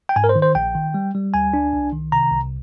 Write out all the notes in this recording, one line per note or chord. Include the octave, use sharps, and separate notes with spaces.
G5
G#2 G#5
A#4
C5
D#3
C5
A#1 G5
D#3
G3
G3
D2 G#5
D4
C2
D#3
C3 A#5
C2